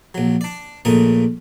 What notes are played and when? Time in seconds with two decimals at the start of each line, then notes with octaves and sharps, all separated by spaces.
0.14 A#1 F#3
0.41 D4 D5
0.85 A#1 A#2 C#3 A3 A#4 D#5